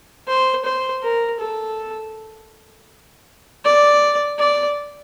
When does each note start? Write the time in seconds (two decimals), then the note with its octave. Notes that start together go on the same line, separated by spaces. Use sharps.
0.28 C5
0.65 C5
1.03 A#4
1.40 A4
3.65 D5
4.39 D5